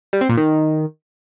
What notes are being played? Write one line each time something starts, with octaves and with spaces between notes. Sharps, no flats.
G3
C4
A#2
D#3